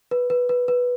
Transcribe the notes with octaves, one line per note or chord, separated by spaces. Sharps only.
B4
B4
B4
B4